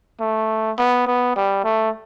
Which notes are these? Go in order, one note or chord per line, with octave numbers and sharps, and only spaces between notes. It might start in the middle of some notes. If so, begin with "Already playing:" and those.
A3
B3
B3
G3
A3